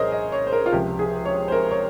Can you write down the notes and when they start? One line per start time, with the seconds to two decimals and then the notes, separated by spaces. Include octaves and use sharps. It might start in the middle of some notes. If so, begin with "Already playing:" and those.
Already playing: C2 A#2 F3 G#4 A#4 C5 C#5 D#5
0.12 D#5
0.32 C#5
0.47 C5
0.52 A#4
0.66 F4
0.73 C#2 C3 F3 G4
0.99 G#4
1.25 C#5
1.48 C5
1.52 A#4
1.71 C#5